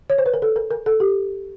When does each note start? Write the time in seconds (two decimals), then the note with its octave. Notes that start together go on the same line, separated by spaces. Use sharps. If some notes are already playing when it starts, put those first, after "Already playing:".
0.10 C#5
0.18 C5
0.26 B4
0.34 A#4
0.42 A4
0.56 A#4
0.71 A#4
0.86 A4
1.00 G4